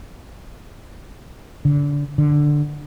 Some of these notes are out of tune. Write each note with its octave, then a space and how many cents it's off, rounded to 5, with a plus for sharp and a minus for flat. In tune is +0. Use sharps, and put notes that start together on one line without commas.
D3 -25
D3 +5